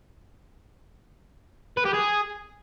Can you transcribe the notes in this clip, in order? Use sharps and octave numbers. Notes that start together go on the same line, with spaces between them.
B4
G4
G#4